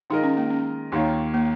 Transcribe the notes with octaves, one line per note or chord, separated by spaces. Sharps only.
D#3 G#3 D#4 F4 A#4 D#5
C#4
A#3
C#4
D#2 D#3 A#3 D#4 F4 C#5
A#3